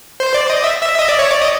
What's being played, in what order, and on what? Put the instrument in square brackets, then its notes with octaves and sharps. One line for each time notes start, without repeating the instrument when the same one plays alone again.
[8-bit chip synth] C5
D5
D#5
E5
E5
D#5
D5
C#5
D5
D#5